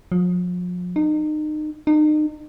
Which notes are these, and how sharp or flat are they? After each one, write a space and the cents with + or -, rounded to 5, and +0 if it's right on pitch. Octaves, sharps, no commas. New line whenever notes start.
F3 +40
D#4 -30
D#4 -35